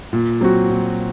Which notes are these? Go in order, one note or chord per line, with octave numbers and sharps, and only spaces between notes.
A#2
F#3 C4 F#4
A#2